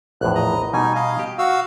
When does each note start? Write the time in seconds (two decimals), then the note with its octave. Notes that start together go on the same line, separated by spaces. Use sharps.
0.21 A#1 E2 A2 F#6
0.35 D#5 A#5
0.73 B2 G3 D#4 G#5
0.95 D#5 F5
1.19 G4
1.38 F#4 F5 E6